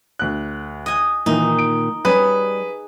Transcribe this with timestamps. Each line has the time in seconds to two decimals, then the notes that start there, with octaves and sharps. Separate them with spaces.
0.19 D2 F#6
0.86 D#5 G#5
1.26 A#2 D#3 E3 D#4
1.59 D7
2.05 G3 C#4 G#4 B4